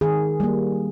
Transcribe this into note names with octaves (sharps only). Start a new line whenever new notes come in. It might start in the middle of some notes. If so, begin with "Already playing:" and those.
D#3 G#4
G3 A#3